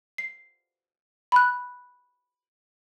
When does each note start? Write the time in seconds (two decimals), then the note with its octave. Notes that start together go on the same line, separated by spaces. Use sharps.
0.18 C7
1.32 B5 F#6